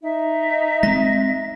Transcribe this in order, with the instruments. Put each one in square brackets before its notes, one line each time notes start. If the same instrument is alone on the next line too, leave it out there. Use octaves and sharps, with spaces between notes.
[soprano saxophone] D#4 [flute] E5
[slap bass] G#3 C4 [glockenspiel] A#6